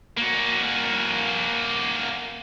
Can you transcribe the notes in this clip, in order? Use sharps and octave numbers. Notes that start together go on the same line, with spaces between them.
A#3 F#4